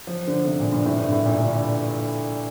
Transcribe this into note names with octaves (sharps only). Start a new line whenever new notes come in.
F3
D3
C3
A#2
G2
A2
G2
A2
A#2
D3